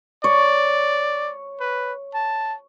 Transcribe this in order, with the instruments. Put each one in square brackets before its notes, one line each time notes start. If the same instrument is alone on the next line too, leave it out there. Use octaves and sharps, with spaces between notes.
[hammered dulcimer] C#5 [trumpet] D5
[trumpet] B4
A5